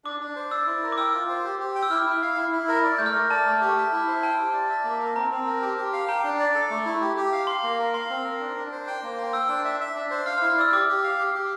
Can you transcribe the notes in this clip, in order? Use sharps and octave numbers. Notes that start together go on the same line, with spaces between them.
D4 D6
D4
C5
D5 E6
E4
A#4
D6
G5 E6
F4
C5
G4
G4
G5
E6
E4 F6
E4
F5
E4
E4
A#4
D5
A3 G6
F6
A#4
D5 A5
A3
G4
E5
E4
C5
G5 A5
G4
D5
E5
A#3
A#4
C4 A#5
C4
A#4
G4
G4
F5
G5 A#5
D4
D5
A4
A3
E4
G4
G4
F5
F5 C6
A#3
A#4
F5 C6
C4
A#4
D4
D4
C5
G5
A#3
C5
G5 E6
D4
E5
E5
D4
C5
F5 F6
F6
E4
F6
D5 E6
G4 D6
G4
F5
G4
G4